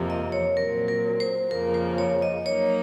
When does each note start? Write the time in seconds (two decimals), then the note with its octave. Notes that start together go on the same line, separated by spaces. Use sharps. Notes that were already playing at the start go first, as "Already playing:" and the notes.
Already playing: F2 C3 F3 A#3
0.10 D#5
0.32 C#5
0.57 A#2 F#3 C4 A#4
0.88 A#4
1.20 C5
1.51 F2 C#3 F3 A#3 A#4
1.74 C5
1.98 C#5
2.22 D#5
2.46 F#3 A#3 D#4 C#5